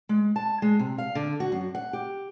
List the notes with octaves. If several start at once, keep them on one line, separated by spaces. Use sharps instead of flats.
G#3
A5
G#3
C3
F5
D3
F#4
F#2
F#5
G4